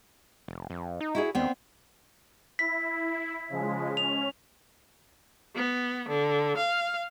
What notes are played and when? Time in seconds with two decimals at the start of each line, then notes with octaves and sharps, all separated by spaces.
0.48 F1
0.70 F2
1.01 D#4
1.15 E4 F#4 G#4
1.35 D#2 B3 C4 D4
2.59 E4 B6
3.49 C#3 F3 G#3
3.97 C#4 F7
5.54 B3
6.07 D3
6.56 F5